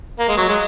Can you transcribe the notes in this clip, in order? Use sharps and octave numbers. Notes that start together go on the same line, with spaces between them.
A#3
G#3
F#3
G#3